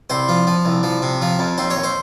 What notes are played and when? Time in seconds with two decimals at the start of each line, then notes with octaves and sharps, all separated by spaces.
0.10 C2 C5
0.29 F3
0.47 F3
0.65 C2
0.83 F3
1.02 C3
1.22 F3
1.39 F2
1.58 D#2 C5
1.70 C#5
1.76 D#2
1.83 C5